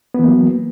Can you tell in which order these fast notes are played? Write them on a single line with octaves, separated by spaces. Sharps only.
B3 E3 A#3 F#3